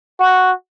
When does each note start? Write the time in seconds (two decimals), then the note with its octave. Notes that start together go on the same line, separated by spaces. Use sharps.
0.20 F#4